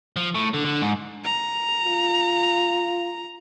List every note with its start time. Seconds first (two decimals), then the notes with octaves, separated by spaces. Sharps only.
0.16 F3
0.34 A2
0.53 D3
0.65 D3
0.82 G#2
1.24 A#5
1.86 F4